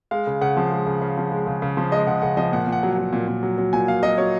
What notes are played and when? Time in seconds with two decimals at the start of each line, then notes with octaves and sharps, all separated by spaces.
0.11 G#3 F5
0.27 C#3
0.41 C#3 F#5
0.57 F3
0.72 G#3
0.87 C#3
1.02 C#3
1.17 F3
1.31 G#3
1.47 C#3
1.62 C#3
1.77 F3
1.92 G#3 D#5
2.07 C#3 F#5
2.22 C#3 F#5
2.37 F3 D#5
2.52 A#2 F#5
2.67 A#2
2.72 F#5
2.83 F#3
2.93 F#5
2.98 F#3
3.13 A#2
3.27 A#2
3.43 F#3
3.58 F#3
3.73 A#2 G#5
3.88 A#2 F5
4.03 F#3 D#5
4.18 F#3 C#5